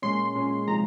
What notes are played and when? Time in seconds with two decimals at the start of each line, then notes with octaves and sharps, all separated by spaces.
0.02 A#2 G#3 C#4 C6
0.35 A#2 G#3 C#4
0.68 C3 F3 G#3 D#4 A#5